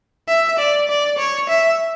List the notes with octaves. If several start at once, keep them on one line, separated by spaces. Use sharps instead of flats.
E5
D5
D5
C#5
E5